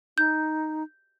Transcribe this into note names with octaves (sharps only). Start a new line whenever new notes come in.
D#4 G6